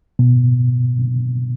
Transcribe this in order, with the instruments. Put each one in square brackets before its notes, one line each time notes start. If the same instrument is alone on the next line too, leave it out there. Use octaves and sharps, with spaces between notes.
[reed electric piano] B2